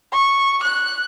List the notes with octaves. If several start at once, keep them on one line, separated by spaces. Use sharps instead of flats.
C#6
F#6